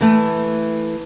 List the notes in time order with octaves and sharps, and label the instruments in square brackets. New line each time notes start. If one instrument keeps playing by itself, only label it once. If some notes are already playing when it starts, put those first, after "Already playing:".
[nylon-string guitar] E3 A3